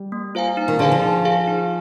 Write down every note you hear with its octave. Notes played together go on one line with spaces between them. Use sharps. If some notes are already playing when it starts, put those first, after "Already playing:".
Already playing: G3
A#3
F4 C5 F5 G#5
D#4
D#3
D3 G#4 C5 F5 G#5
F3
D#4
G#4 C5 F5 G#5
D#4